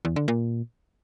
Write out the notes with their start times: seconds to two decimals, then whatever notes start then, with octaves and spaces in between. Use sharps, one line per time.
0.05 E2
0.16 D3
0.28 A#2